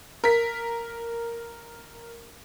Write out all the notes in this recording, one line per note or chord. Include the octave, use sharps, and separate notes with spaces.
A#4 B6